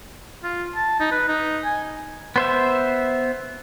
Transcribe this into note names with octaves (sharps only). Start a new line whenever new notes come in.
F4
A5
D#4
B4
D#4
G#5
B3 C5 E5